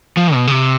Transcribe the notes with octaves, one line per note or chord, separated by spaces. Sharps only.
F3
B2
C#3
C3